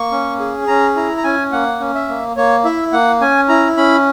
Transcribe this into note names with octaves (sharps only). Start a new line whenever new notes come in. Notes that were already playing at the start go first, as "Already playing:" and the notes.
Already playing: A#3 C#6
C#4
G#4
C#4 A#5
E4 A#5
A#5
C#4 G#5
A#3 F#5
C#4
E5
A#3
A#3 C#5
E4 E5
A#3 F#5
C#4 G#5
E4 A#5
C#4 B5